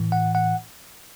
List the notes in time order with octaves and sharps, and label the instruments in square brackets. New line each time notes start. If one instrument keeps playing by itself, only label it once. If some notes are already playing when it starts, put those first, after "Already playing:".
Already playing: [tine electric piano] A2 E3
F#5
F#5